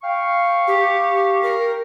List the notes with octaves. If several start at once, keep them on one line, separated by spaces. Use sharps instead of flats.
F5 G5 C#6
G4
A#4